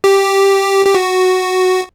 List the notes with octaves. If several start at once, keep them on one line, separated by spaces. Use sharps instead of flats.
G4
G4
F#4